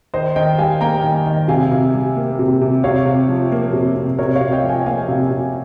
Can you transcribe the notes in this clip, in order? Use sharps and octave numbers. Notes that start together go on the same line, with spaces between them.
D#3 C5 D#5
D#3 D#5 G5
G3 F5 G#5
A#3 G5 A#5
D#3
D#3
C3 F5 G#5
C3
G3
A#3
C3
C3
C3 C#5 F5
C3
F3
A#3
C3
C3
C3 A#4 C#5
C#5 F5
C3
D#5 G5
F3
F5 G#5
A#3 F5 G#5
C3
C3